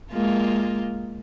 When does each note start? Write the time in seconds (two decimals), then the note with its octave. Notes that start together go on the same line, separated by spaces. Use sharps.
0.12 G#3 A#3 F4